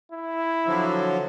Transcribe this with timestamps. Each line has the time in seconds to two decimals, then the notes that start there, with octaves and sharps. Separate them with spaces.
0.12 E4
0.66 D3 F3 F#3